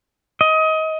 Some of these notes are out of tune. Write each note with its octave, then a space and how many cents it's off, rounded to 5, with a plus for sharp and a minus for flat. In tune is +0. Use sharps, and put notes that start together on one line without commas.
D#5 +25